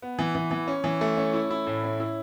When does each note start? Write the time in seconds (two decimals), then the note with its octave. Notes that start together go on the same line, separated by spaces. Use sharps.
0.02 B3
0.19 E3
0.35 E3
0.51 E3
0.68 C#4
0.84 E3
1.01 A3
1.18 C#4
1.34 E4
1.51 E4
1.67 A2
1.84 C#4
2.00 E4